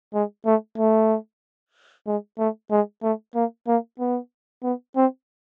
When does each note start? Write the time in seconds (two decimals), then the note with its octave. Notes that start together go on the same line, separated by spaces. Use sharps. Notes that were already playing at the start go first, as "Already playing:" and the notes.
0.14 G#3
0.46 A3
0.78 A3
2.07 G#3
2.39 A3
2.71 G#3
3.03 A3
3.35 A#3
3.67 A#3
4.00 B3
4.64 B3
4.96 C4